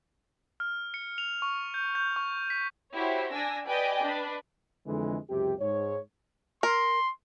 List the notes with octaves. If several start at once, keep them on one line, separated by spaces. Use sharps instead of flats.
F6
C#7
F7
C#6
G6
G6
C#6
B6
E4 F#4 G4 C5 C#5
D4 D5 G#5 E6 A#6
G4 B4 D5 D#5 G5 G#5
D4 B4 B5
F2 D3 E3 G#3
C#2 F#2 C3 G4
G#2 C#5
A#4 C6